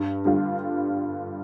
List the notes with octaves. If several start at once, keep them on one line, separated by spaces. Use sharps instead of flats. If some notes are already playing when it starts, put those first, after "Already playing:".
Already playing: G2
D3 G3 D4 F4